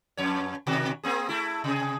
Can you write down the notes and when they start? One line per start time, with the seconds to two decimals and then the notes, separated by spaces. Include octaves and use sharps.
0.17 F2 C#5
0.67 B2 D#3 F#4
1.03 A#3 C4 G#4
1.29 A3 E4
1.64 C3 G#4